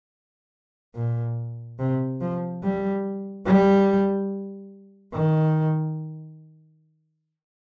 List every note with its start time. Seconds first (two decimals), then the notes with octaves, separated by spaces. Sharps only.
0.95 A#2
1.79 C3
2.21 F3
2.63 G3
3.46 G3
5.13 D#3